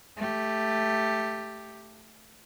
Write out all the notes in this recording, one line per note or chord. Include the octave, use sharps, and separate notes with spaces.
A3 G4